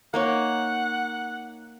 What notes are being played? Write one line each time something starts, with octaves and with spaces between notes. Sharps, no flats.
A#3 D#4 C#5 F#5